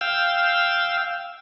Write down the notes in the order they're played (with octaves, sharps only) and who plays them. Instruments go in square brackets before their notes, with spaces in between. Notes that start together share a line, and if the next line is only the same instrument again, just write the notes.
[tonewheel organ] F5 G5 E6